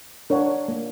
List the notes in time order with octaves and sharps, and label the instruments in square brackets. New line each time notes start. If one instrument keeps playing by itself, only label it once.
[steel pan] D4 A#4 C#5 F#5
A#3